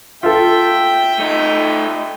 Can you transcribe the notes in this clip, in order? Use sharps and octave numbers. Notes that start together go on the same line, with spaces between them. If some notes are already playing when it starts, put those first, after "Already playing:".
F4 A4 E5 G5
A3 D#4